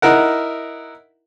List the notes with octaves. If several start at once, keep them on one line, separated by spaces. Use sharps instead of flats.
D#4 E4 A#4 F#5